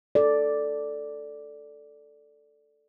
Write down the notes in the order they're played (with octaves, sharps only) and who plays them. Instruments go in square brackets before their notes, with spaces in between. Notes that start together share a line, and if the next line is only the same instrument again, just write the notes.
[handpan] A4 D5